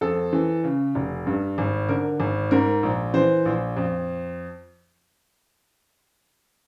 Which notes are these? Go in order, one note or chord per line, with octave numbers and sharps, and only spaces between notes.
F2 A4
E3
C#3
F1
G2
G#1
D3 A#4
G#1
G#2 A#4
A#1
E3 C5
A#1
F2